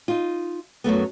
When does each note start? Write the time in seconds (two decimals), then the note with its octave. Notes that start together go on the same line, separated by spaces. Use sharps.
0.08 D#4 F4
0.84 F#2 F#3 A3 B3